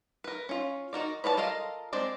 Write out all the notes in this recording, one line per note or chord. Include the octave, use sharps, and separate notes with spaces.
A#4 B4
C#4 F4
D#4 F#4 A#4 D5
B4 C#5 D5 A5
F4 A4 A#4 D#5 F5
G#3 C4 D4 D5